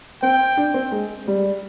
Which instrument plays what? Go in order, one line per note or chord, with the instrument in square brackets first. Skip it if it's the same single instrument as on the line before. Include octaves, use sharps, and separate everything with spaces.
[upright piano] C4 [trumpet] G5
[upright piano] D4
C4
G#3
G3